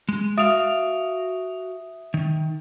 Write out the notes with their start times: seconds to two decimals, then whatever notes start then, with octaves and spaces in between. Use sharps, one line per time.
0.09 G#3
0.37 F#4 E5 F5 D#6 D7
2.14 D#3